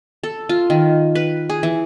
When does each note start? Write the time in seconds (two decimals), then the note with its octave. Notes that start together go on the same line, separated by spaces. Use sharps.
0.24 A4
0.49 F4
0.70 D#3
1.15 B4
1.50 G#4
1.63 E3